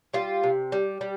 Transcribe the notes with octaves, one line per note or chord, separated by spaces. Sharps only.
G3 F4
C3
G3
G3